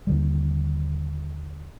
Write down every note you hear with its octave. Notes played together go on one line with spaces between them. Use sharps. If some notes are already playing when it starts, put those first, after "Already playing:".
D#2 D3 G3